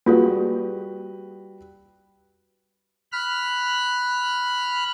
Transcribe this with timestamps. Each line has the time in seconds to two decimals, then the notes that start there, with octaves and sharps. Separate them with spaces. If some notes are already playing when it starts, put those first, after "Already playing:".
0.06 G3 A#3 F4 F#4 G#4 B4
3.12 B5 F6 F#6